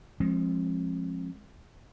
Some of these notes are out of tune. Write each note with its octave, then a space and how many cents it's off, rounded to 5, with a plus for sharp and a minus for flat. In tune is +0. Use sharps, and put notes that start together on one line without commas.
F3 +0 G#3 +0 C4 +45